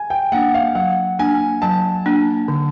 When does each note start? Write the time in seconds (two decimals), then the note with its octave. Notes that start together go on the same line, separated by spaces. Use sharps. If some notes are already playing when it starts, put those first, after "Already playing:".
Already playing: G#5
0.10 G5
0.32 A#3 D4 F#5
0.54 F5
0.75 F#3 F#5
1.19 A#3 D4 G#5
1.62 F#3 A5
2.06 A#3 D4
2.48 D3